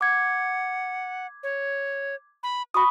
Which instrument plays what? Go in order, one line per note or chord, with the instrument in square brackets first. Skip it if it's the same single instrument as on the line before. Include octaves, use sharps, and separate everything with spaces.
[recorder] F#5 [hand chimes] D6 G#6
[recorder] C#5
B5
[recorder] F#4 [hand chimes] B5 C#6 D#6